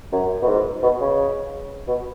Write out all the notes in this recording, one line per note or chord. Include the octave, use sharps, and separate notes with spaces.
F#2
B2
G#2
B2
C#3
B2